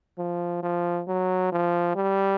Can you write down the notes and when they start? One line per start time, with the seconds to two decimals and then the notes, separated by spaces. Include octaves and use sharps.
0.18 F3
0.63 F3
1.08 F#3
1.52 F3
1.96 G3